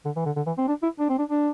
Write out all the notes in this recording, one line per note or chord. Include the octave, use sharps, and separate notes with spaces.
D3
E3
D3
D3
E3
C4
D4
E4
D4
C4
D4
D4